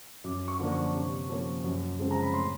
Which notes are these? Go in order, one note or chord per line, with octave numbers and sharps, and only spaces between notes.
F#2 D6
C#6
D3 F3 A#3 D4
C#6
C3
F3 A#3 C#4
F#2
C#3 F3 G#3 C4
A#5
B5
A2 C6